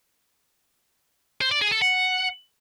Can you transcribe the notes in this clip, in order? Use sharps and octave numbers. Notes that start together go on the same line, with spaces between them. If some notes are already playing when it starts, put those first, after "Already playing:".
C5
D5
G#4
A4
F#5